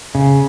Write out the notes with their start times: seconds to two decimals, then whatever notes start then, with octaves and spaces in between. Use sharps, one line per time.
0.15 C#3